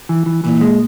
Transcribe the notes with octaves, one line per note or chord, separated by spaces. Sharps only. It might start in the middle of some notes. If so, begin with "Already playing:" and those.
E3
E3
A#2 E3
G#3